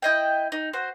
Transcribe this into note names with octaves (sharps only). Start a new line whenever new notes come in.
E4 D#5 G5
D#4
F#4 C5